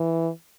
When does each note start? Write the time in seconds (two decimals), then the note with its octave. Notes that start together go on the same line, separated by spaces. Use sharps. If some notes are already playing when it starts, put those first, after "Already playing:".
Already playing: E3